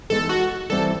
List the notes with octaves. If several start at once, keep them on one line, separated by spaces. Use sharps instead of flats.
E3 G#3 B3 D#4 A4
F#4
E3 G3 C4 E4 A4